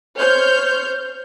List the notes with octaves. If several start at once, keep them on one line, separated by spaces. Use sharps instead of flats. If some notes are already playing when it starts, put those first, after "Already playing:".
C5 C#5 F6 G6